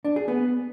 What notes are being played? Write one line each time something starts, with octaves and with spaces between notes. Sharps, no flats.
D4
G#4
B3